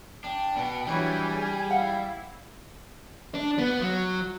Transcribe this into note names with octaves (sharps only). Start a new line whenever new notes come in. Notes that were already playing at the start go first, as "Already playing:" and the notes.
D4 G5
B2 B3
E3 F#3 G3 D4 C#5 G#5 B5
G#4
E4 F5 F#5
D4
B3
F#3